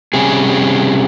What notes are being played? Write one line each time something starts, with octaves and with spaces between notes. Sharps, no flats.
C3 G3 C#4 G#4